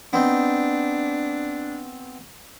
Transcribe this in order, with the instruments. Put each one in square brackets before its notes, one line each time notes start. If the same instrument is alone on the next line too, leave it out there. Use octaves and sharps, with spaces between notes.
[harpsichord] B3 C4 D#4 [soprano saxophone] D4